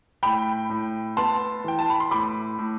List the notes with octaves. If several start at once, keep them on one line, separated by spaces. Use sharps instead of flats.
A2 G5 B5
A2
B3 A5 C6
E3 G5
A5
B5
C6
A2 B5 D6
A2